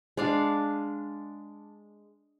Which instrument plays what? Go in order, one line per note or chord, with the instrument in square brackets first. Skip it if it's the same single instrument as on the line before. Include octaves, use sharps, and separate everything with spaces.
[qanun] G#3 D4 F5